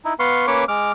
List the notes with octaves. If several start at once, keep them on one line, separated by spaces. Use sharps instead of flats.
D#4 E4
B3 B4 F5 C6 C#6
A#3 C#4 B4 C#5 C#6 D6
G#3 D6 F6